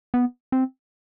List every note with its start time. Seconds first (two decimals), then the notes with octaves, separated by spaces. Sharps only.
0.14 B3
0.52 C4